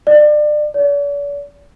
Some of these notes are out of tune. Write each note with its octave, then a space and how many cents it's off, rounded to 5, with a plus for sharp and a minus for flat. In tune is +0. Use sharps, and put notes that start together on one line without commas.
D5 +30
D5 -45